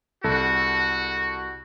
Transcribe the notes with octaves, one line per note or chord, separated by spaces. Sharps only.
C2 F#4 A4